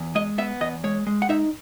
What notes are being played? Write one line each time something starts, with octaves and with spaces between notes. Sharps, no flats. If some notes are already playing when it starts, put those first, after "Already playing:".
Already playing: E2
G#3 D#5
B3 E5
E2 D#5
G#3 C#5
G#3
F#5
D#4 E5